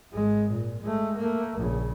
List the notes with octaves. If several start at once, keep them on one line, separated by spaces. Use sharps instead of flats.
G#1 G#3
A#2
G#3 A3
A3 A#3
A#1 C#3